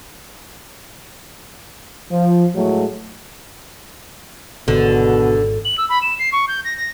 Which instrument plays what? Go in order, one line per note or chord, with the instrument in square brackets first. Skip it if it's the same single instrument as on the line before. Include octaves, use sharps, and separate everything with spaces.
[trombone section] F3
A2 F#3 G#3 A3
[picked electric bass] G#1 [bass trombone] B2 [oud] D3
[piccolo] F#7
E6
B5
E7
C7
C#6
G6
A#6
A#6